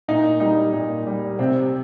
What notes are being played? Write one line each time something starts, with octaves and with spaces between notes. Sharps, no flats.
A#2 D#4
G3 D#4
A#2
G3
C3 C4